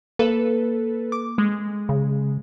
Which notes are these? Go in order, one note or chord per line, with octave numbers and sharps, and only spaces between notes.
A#3 A4 B4
D6
G#3
C#3